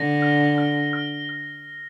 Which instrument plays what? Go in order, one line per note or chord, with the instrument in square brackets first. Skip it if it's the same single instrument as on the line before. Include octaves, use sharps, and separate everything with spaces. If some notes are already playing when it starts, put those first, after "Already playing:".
Already playing: [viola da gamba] D3 [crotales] A#6
[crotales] F6
F6
F6
F6